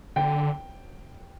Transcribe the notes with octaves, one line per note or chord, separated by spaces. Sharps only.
D3 G5